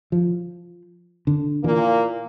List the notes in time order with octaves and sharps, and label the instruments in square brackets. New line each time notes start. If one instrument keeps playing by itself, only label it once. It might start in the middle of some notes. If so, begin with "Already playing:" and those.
[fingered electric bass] F3
D3
[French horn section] A#2 A#3 [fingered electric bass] E3